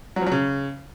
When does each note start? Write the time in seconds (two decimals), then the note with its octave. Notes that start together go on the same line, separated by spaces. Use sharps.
0.16 F#3
0.21 F3
0.26 F#3
0.32 C#3